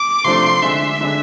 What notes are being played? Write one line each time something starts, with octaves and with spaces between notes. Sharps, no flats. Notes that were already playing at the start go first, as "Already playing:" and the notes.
Already playing: D6
C3 F3 A3 D4 C6
D3 G#3 D4 E5
D3 G#3 D4